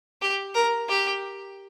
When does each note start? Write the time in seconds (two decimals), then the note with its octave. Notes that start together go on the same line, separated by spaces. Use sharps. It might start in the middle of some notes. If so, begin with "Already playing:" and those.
0.22 G4
0.55 A#4
0.88 G4